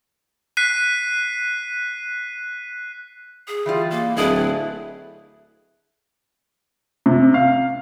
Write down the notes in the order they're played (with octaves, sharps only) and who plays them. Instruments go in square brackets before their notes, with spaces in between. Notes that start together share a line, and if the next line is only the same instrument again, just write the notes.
[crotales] F#6 B6 C7 D#7
[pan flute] G#4
[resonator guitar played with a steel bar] E3 G3 F4
[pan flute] A#3
[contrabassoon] D1 [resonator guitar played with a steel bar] A3 G#4 B4 [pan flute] E4
[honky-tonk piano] C3
F5